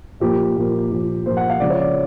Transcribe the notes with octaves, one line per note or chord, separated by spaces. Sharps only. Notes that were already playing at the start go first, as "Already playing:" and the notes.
A#2 F3 A#3 G4
A#2 F3 A#3
A#2 F3 A#3
A#2 F3 A#3 C5
F#5
F5
C#3 F3 G#3 D5
C#5
D5